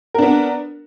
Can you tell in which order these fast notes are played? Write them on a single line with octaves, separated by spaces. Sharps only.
A#4 D4 B3